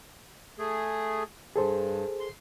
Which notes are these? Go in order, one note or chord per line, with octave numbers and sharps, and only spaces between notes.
A3 G#4
G2 G#4 A4 C5
C6